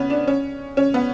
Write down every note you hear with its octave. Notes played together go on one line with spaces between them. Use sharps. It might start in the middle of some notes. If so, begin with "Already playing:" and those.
Already playing: B3 C#4
D4
C#4
C#4
B3